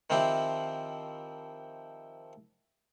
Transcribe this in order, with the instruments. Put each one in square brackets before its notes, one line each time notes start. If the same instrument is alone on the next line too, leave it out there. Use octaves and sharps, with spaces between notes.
[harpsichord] D#3 F3 C4 E4 G4